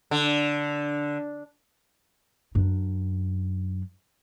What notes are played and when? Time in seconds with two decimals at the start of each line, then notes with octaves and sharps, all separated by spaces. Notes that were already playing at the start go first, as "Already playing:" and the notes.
0.11 D3
2.55 F#2 D4